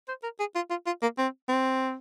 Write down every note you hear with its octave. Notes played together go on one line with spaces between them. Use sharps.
C5
A#4
G#4
F4
F4
F4
A#3
C4
C4